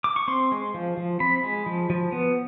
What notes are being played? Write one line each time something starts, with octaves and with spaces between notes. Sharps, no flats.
D6
C#6
C4 C6
G#3
F3
F3
C4 B5
G#3
F3
F3
B3